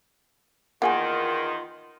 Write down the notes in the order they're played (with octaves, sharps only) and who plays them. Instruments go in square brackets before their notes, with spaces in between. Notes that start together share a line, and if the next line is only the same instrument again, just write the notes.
[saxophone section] E2 D#3 [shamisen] A#3 G#4 G#5 [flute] F4 [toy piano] F#5